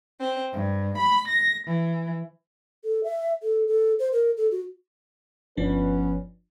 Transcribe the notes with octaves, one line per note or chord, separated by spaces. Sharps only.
C4
G2
B5
A#6
E3
A4
E5
A4
A4
C5
A#4
A4
F#4
G1 F3 B3 C#4 D4 B4